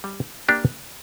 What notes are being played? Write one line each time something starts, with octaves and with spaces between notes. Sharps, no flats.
G3
A#3 D4 G4